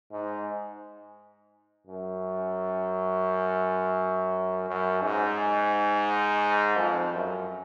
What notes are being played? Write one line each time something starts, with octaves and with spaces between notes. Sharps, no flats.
G#2
F#2
F#2
G#2
F2
F#2